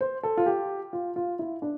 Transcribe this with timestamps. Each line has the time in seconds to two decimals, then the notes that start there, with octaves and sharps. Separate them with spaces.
0.01 C5
0.23 A4
0.37 F4
0.46 G4
0.93 F4
1.16 F4
1.39 E4
1.62 D4